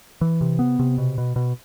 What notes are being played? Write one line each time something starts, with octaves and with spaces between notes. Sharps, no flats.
E3
C3
B3
C3
B2
B2
B2